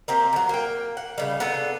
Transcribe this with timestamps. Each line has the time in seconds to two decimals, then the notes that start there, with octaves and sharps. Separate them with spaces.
0.08 A#3 C4 G4
0.33 D#3 F#3
0.49 A#3 G5
0.97 F#5
1.18 C#3 G3
1.40 B3 D4 A4